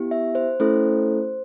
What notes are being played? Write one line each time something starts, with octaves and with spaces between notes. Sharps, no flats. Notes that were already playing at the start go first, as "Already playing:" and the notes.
Already playing: B3 E4 G4
E5
C5
A3 C#4 E4 A4 C5